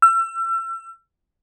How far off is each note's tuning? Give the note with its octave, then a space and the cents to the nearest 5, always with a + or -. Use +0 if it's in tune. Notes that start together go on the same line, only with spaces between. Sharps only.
E6 +35